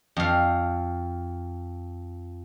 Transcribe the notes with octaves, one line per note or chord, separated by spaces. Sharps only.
F2 F5